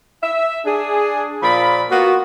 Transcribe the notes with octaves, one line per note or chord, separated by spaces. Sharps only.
E5
D4 G#4
A#2 F3 D5 B5
A#3 B3 F4 F#4